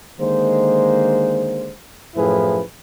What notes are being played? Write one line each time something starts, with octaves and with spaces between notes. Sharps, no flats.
D3 D#3 G#3 A#3 C5
F#2 A2 F3 E4 G#4 B4